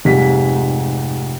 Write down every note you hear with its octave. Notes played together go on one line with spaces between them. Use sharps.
F1 G#2 G3 B6